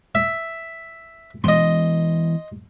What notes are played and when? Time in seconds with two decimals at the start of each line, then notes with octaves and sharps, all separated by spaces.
0.15 E5
1.44 E3 G#3 B3 D#5 C6